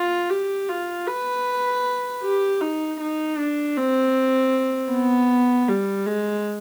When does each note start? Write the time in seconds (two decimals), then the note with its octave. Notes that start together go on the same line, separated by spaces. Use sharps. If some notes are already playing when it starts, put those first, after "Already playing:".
Already playing: F4
0.30 G4
0.69 F4
1.07 B4
2.23 G4
2.62 D#4
3.00 D#4
3.38 D4
3.77 C4
4.91 B3
5.69 G3
6.06 G#3